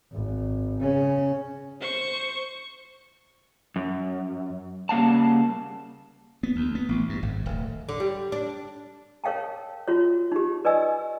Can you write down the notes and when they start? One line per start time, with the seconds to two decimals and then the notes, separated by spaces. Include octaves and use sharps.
0.12 G#1
0.80 C#3 C#4
1.80 C5 C#6
3.76 F#2
4.89 C#3 G3 A#3 F5 F#5 A5
6.43 B3
6.56 D2
6.75 B3
6.89 A1
7.09 G2
7.23 G#1
7.46 D1
7.89 D3
8.00 G3
8.32 D4
9.24 A#4 C#5 F5 G5 A5
9.88 F4 F#4 C#5
10.32 D#4 G4
10.65 B4 D5 D#5 G#5 E6